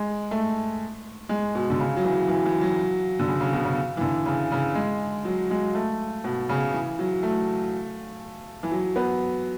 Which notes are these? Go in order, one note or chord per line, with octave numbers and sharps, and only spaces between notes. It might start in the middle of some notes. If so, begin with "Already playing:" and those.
Already playing: G#3
A3
G#3
B2
D3
C#3
F#3
E3
E3
E3
F#3
D3
C#3
C#3
B2
C#3
E3
D3
C#3
C#3
G#3
F#3
G#3
A3
B2
C#3
E3
F#3
A3
E3
F#3
B3